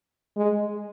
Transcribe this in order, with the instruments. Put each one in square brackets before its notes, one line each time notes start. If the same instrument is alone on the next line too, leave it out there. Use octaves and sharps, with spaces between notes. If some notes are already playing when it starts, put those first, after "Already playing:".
[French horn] G#3